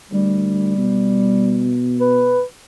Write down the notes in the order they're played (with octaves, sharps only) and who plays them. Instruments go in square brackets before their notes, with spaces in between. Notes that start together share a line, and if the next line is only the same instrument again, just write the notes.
[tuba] D2 [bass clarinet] G3
[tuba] B2
[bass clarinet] B4